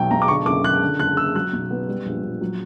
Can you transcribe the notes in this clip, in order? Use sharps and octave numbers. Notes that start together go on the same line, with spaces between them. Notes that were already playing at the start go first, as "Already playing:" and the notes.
Already playing: B1 F#3 G5
B1 A#5
D6
D3 C#6
F#1 D6
F#1 F#6
D3
F#1 F#6
A#3 E6
F#3 F#6
B1
B3
G3
A#1
A#1
F#3